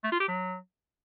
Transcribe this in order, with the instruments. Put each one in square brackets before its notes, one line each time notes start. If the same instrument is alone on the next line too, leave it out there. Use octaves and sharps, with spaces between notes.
[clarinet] A3
F4
G4
F#3